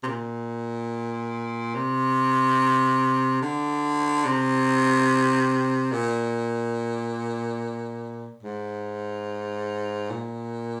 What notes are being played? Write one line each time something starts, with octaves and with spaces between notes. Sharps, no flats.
C3
A#2
C3
D3
C3
A#2
G#2
A#2